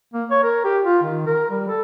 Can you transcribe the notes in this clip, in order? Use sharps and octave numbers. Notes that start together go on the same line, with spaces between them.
A#3
C#5
A#4
G4
F4
D#3
A#4
G3
A4